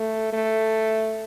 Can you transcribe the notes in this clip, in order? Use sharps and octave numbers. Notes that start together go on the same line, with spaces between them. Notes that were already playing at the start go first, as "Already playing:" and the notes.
Already playing: A3
A3